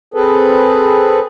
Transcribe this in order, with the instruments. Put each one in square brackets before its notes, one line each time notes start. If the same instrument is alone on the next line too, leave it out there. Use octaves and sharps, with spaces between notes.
[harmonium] C4 G#4 A4 B4